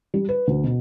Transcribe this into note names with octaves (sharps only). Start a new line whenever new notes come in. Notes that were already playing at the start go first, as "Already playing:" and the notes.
G3
B4
D2
B2